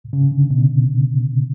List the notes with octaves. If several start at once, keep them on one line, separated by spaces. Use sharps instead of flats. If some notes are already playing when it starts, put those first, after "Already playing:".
C#3
D3
B2